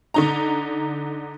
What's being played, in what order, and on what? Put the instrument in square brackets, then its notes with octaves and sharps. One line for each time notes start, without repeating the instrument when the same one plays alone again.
[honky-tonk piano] D3 D#4 A#5